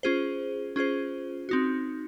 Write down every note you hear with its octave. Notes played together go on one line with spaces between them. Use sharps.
C#4 F4 G#4 C5
C#4 F4 G#4 C5
C4 D#4 F#4